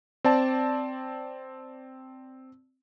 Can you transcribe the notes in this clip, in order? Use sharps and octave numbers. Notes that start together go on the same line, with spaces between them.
C4 D5 A5